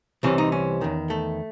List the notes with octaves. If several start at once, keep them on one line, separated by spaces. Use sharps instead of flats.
C2 C3 E3 C#4
D#4
C#4
E2 D#3
A3